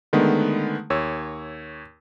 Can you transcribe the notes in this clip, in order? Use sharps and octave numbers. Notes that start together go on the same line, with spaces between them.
D3 D#3 G#3 A3 B3
D#2 C#5 E6